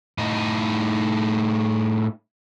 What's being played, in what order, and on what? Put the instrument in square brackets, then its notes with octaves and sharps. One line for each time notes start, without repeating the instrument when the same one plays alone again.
[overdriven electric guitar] A2 D#4